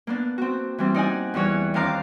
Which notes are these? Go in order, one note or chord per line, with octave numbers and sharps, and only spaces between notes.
A#3 B3 D4
C4 F#4
E3 G3 C4
D#4 D5 F#5 G#5
E2 E3 G3 C#5 F#6
D#2 C4 D4 F5 A#5 D6